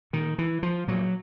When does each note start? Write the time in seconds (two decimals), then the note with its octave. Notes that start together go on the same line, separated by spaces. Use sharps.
0.13 A#2 D#3
0.38 E3
0.63 F3
0.88 A#2 F#3